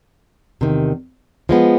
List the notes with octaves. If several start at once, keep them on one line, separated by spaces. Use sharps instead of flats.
E2 C3 D#3
F3 G#3 B3